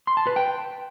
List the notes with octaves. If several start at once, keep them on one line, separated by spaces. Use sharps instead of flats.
C6
A5
B4
G5